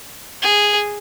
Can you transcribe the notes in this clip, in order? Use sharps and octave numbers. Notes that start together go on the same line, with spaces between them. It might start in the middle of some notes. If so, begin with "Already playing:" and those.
G#4